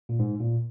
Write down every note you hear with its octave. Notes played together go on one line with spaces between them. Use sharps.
A#2
G#2
A#2